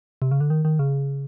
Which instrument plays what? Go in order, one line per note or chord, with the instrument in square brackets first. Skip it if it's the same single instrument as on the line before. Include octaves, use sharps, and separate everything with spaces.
[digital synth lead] C3
C#3
D3
D#3
D#3
C#3